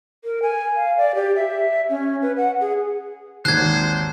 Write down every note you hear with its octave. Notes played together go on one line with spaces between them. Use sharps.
A#4
G#5
F5
D5
G4
E5
C#4
B4
F#5
G#4
G#1 D#2 C5 F#6 G#6